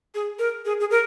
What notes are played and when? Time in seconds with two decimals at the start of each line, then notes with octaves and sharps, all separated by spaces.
0.14 G#4
0.39 A#4
0.65 G#4
0.80 G#4
0.91 A#4